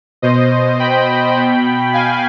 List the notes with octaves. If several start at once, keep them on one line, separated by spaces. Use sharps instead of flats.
B2 C5 D#5
G5 B5
B2
F5 G#5